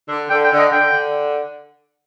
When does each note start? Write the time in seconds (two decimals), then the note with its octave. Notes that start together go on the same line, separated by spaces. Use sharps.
0.09 D3
0.29 D3 G5
0.44 G5
0.51 D3
0.58 D#5
0.71 D3 G5
0.93 D3